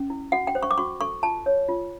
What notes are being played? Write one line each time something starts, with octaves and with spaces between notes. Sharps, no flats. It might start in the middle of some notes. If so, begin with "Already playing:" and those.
Already playing: C#4
E4
F#4 F#5
G5
C5
C#6
D6
F#4 C#6
A4 C#6
F4 A5
C#5
F4